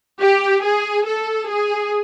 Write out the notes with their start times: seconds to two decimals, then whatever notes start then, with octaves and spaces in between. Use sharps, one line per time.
0.20 G4
0.63 G#4
1.05 A4
1.48 G#4